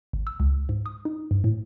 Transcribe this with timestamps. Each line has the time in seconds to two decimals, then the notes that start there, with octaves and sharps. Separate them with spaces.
0.13 G#1
0.27 E6
0.40 C#2
0.69 G#2
0.86 D#6
1.05 D#4
1.31 G2
1.44 A2